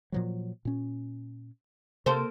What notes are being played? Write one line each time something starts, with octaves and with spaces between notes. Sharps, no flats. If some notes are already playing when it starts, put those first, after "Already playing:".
A#2 F3 F#3
A#2 C#4
C3 A#3 A4 C5